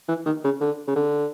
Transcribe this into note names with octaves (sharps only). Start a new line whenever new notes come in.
E3
D#3
C#3
D3
C#3
D3